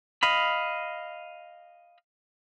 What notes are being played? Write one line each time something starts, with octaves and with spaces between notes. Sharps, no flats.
D#5 F5 B5